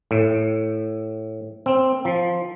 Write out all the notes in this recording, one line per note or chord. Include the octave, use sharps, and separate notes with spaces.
A2
C4
F3